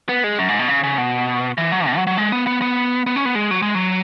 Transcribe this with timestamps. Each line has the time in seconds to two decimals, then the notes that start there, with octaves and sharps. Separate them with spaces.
0.09 B3
0.24 G#3
0.39 F#2
0.49 G#2
0.59 B2
0.68 C#3
0.84 C#3
0.98 B2
1.58 E3
1.72 F#3
1.87 B2
1.97 F#3
2.07 F#3
2.17 G#3
2.32 B3
2.47 B3
2.62 B3
3.06 B3
3.16 C#4
3.25 B3
3.35 G#3
3.51 F#3
3.62 G#3
3.75 F#3